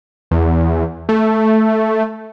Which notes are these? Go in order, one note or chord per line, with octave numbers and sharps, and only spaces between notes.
E2
A3